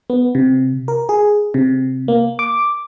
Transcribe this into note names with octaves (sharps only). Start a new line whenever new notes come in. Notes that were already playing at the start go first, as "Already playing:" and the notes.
B3
C3
A#4
G#4
C3
A#3
D6